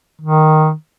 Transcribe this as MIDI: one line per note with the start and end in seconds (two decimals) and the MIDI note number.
0.22 0.72 51